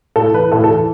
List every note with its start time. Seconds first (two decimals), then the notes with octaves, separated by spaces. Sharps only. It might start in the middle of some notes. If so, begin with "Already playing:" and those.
0.16 A2 A4
0.34 E3 B4
0.52 A2 A4
0.64 A4
0.70 E3